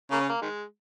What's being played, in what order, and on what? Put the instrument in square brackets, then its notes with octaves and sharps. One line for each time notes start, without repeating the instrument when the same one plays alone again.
[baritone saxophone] C#3 [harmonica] A#3
[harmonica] C#4
A#3
D#3 G#3